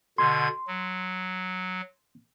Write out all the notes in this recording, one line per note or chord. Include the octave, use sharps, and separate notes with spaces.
B2 D3 C6 G#6
F#3